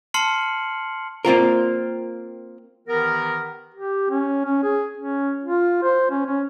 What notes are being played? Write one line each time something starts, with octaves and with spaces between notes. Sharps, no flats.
A5 C6 F6 C7 C#7 F#7
A#3 C4 F4 A#4
D#3 E3 B3 G4 A#4
G4
C#4
C#4
G#4
C#4
F4
C5
C#4
C#4